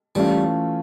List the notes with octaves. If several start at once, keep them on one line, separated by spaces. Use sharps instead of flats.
E3 G3 A3 C#4 F4